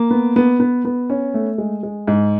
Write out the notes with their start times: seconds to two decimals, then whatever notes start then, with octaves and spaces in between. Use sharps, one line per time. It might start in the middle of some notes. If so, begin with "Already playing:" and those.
Already playing: A#3
0.11 B3
0.36 B3
0.60 B3
0.85 B3
1.10 C#4
1.34 A3
1.58 G#3
1.83 G#3
2.08 G#2